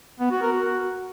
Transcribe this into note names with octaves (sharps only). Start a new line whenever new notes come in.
B3
F#4
A#4
F#4